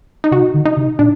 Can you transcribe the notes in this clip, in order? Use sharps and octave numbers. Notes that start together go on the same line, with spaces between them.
D#4
C3 F#4
D3
D#4
C3
A#2 D4